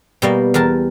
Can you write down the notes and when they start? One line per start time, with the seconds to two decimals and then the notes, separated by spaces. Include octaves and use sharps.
0.22 B2 G3 A#3
0.54 E2 G4 A#4 A5